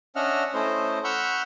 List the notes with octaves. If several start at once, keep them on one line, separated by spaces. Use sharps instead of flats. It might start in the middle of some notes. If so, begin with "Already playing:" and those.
C#4 D4 D#5 E5 F#5 F6
A3 C#4 E4 C5 D#5
F#5 B5 C#6 E6 F6 G6